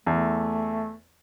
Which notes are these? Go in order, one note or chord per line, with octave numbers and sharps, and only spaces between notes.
E2 A3